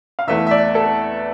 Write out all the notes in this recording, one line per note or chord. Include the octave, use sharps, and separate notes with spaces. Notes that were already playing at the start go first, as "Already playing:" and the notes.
F5
E2 E3 A3 E5
E5
D5
A4